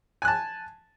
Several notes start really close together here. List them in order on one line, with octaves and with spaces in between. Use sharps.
G#5 F#6 A5